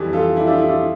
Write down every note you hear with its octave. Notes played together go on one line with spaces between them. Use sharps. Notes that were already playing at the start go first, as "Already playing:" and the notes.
Already playing: F2 E3 G3
F4 A4
E4 G4
D4 F4
E4
D4 F4